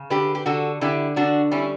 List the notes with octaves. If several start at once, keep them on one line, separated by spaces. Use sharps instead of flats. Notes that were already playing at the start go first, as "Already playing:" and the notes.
Already playing: C#3
D3 G4 B4
G4
D3 F#4 A4
D3 E4 G4
D3 D4 F#4
G3 C#4 E4